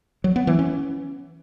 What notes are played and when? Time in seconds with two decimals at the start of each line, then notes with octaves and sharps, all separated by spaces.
0.24 F#3
0.36 B3
0.47 E3
0.59 C#4